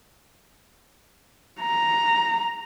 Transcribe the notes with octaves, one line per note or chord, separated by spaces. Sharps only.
A#5